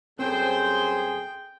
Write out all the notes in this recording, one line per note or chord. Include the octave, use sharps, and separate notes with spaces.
F#2 G3 C4 G#4 A4 C5 G5